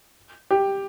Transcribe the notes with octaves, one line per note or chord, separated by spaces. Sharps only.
G4